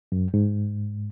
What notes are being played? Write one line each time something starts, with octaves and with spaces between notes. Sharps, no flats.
F#2
G#2